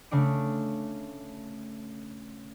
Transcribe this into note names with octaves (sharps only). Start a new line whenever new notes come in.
C#3 A3 D4 D7